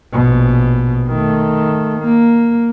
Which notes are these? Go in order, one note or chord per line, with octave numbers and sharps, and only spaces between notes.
A#1 B2
D#3 A3
A#3